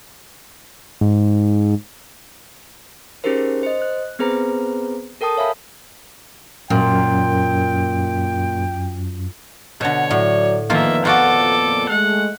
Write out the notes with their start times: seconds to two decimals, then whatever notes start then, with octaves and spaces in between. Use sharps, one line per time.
1.01 G#2
3.24 C#4 D#4 G4 G#4 A#4 C5
3.63 C5 D#5
3.82 F#6
4.19 B3 C4 G#4 B4 C5 A#5
5.21 A4 A#4 G5 A5 D#6
5.37 C#5 E5 F5 G#5 B5
6.70 F#2 A#2 G5
9.81 B2 D3 C#5
10.11 A2 F#3 D5
10.70 F2 A#2 D#3 F3 A#3 B3 F4 E5
11.05 F4 F#4 A4 D5 D6
11.89 G#3 A3 F#5